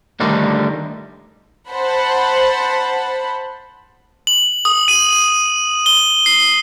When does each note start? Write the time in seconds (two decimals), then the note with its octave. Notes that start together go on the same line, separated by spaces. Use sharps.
0.20 D3 D#3 G3 A3 D4 D#4
1.71 C5 F#5 A5 B5
4.27 F#7
4.65 D#6
4.88 D#7
5.86 G7
6.26 C7